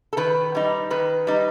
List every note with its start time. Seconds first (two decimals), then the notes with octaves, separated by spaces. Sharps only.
0.13 A4
0.17 D#3 B4
0.55 G3 D#4
0.90 D#3 B4
1.27 G3 D#4